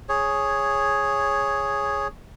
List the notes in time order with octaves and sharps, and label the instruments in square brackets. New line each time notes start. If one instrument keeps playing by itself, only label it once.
[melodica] G#4 C#5